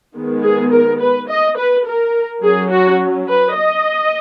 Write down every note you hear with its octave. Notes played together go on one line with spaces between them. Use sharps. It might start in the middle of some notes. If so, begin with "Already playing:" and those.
D#3 G#3 B3
G#4
A#4
B4
D#5
B4
A#4
F#3 C#4 G#4
F#4
B4
D#5